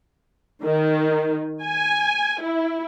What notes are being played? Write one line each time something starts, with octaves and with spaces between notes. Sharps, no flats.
D#3
G#5
E4